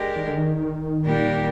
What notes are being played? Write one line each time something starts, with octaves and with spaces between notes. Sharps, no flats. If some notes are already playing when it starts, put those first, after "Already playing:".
Already playing: G#3 D4 G4 A#4
D#3
D3
D#3
A#2 G3 D4 G4 A#4